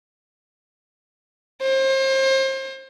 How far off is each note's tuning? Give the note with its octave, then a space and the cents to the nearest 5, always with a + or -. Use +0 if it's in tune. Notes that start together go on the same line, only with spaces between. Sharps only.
C5 +35